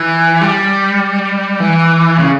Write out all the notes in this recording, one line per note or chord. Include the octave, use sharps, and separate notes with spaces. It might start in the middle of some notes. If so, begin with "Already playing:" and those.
Already playing: E3
G3
E3
C#3